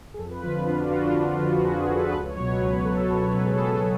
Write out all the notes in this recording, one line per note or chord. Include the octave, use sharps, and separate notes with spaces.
G#4
F2 A4
B4
D3 F3 F4
F4
F2 D4
F#4
D3 F3 F4
D4
F2 F4
D4
D3 F3 F4
F#4
F2 G#4
D3 F3 A4 B4
A4
C#2 B4
C#5
B2 F#3 C#5
B4
C#2 B4
B2 F#3 A4
C#2 C#5
B4
B2 F#3 A4
G#4
C#2 A4
F#3